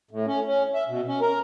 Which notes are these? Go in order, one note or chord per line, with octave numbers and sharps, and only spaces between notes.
A2
C#4
C#4
E5
B2
C#4
A#4